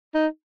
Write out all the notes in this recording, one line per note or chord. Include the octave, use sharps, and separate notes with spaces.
D#4